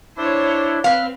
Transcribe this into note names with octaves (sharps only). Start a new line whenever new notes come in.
D4 E4 C5 C#5
C4 B4 F5